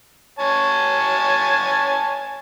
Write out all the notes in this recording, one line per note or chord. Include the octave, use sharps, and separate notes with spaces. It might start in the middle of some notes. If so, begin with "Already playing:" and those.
C#5 G#5 A5